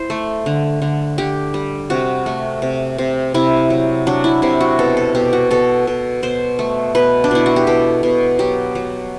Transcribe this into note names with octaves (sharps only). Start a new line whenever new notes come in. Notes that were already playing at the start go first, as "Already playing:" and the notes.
Already playing: E4 C5
A3
D3
D3
D3 G4
G3
C3 F#4
A3
C3
C3
C3 E4
F#3
F#3 D4
E4
C3 E4
F#4
B2 A4
A4
B2 G4
F#4
B2 A4
B2
B2 C5
A3
B2 B4
D4
B2 E4
F#4
G4
B2 A4
B2
F#3 G4
F#3